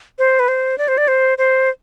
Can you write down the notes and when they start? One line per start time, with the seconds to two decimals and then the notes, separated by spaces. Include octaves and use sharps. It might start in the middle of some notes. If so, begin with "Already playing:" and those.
0.19 C5
0.40 B4
0.48 C5
0.78 D5
0.88 C5
0.98 D5
1.08 C5
1.38 C5